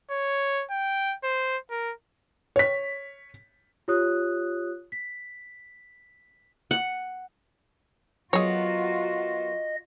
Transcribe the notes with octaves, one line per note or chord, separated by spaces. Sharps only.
C#5
G5
C5
A#4
C#5 B6
F4 G4 C#5 D#6 F#6
B6
F#5
F#3 B3 F4 F#4 G#4 A#4 C#5 D#5